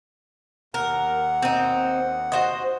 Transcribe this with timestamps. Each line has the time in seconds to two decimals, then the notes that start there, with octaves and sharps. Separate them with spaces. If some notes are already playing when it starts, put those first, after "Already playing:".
0.74 D#2 A#4 F#5
1.42 C4 D#4
2.32 F#4 C5 D#5